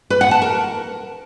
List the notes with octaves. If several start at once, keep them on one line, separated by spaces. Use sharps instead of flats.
B4
F#5
A5
A#4